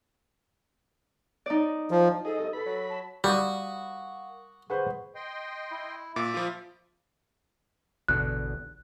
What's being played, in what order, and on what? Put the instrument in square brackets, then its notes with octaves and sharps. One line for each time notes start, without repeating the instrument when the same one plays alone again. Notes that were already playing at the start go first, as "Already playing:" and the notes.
[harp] D#4 D5
[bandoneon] F3
[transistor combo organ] D#4 D#5 [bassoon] G#4 [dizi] A4
[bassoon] C2
[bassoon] B2 [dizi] A4 [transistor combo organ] B5
[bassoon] F#3
[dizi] A5
[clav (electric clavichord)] G3 [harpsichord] F#4 [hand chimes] A#4 F5 F#5 [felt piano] B5 D6 D#6
[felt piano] G#4 B4 C5 [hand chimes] F#5 C#6
[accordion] D#5 G5 C6
[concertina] E4
[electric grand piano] A#2 [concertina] E5 [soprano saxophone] D6
[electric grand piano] F3 F4 [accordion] B5 D#6 F6
[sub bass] A1 [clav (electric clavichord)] E2 B2 D3 [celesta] F#6